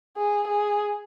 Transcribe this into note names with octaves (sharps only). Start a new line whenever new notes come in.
G#4
G#4